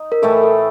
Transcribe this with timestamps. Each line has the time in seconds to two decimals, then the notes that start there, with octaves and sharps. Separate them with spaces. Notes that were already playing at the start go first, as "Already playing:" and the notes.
Already playing: D#4
0.12 A#4
0.22 A2 E3 A3 A4
0.43 A4